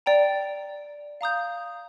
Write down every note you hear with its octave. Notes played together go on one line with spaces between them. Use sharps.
D5 G5 A#5
F5 A#5 D#6 G6